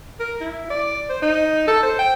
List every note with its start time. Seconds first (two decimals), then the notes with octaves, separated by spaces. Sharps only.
0.20 A#4
0.41 E4
0.70 D5
1.09 C5
1.22 D#4
1.68 A4
1.83 C5
1.99 G5